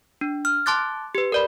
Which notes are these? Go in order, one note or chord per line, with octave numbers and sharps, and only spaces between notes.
D4
F6
A5 C6 D6 F#6 A6
G4 B4
A#4 D5 B5